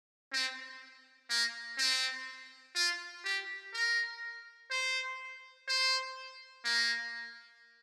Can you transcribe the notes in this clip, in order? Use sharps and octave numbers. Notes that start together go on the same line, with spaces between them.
C4
A#3
C4
F4
G4
A#4
C5
C5
A#3